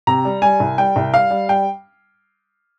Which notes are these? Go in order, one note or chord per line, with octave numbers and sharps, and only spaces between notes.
C3 A#5
G3
G3 G#5
C2
G3 G5
C2
G3 F5
G3
G3 G5